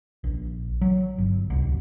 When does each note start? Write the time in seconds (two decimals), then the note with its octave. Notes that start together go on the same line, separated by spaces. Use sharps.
0.24 A#1
0.81 F#3
1.18 G1
1.50 C2
1.62 D1